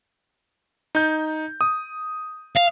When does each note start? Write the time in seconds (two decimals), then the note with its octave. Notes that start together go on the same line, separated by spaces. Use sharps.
0.95 D#4 G6
1.61 D#6
2.56 F5